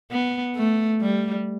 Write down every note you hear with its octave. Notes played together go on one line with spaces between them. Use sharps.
B3
A3
G3